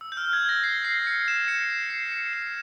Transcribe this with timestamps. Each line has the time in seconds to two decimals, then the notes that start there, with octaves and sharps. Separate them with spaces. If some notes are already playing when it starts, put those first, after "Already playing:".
0.01 E6
0.12 G6
0.17 F6
0.33 G#6
0.49 A#6
0.64 C7
0.85 C7
1.07 C#7
1.28 E7
1.48 C#7
1.70 C7
1.90 C7
2.12 C#7
2.33 E7